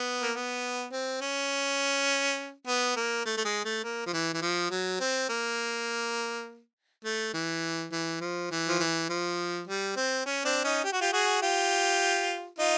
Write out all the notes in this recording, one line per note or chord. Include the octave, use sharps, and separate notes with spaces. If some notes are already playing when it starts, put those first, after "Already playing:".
Already playing: B3
A#3
B3
C4
C#4
B3
A#3
A3
A3
G#3
A3
A#3
F3
E3
E3
F3
F#3
C4
A#3
A3
E3
E3
F3
E3
F3
E3
F3
G3
C4
C#4
C4 D4
C#4 D#4
G4
F#4
F4 G4
F#4 G#4
F4 G4
D#4 F4